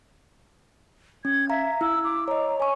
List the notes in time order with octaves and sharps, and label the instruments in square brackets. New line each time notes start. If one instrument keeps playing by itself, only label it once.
[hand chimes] C#4 [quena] G#6
[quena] E5 [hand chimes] F5 A#5
[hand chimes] E4 [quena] E6
[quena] D6
[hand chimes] C#5 D#5 [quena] A#5
[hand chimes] C#5 C#6 [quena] G#5